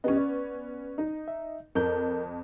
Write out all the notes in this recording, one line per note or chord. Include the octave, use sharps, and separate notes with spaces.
C#2 B3 C#4 G4 D#5
D5
D#4
E5
F2 A#4 G6